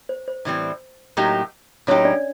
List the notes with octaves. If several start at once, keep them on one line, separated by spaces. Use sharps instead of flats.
C5
C5
A2 E3 G3 C4
A2 F#3 A#3 D#4 G4
A2 F#3 A#3 C#4 D#4 G4 C#5
D4 D5